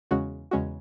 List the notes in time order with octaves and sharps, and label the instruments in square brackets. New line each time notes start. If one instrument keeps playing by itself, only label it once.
[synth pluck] E2 C#3 G#3 C#4 F#4
E2 C#3 G#3 C#4 F#4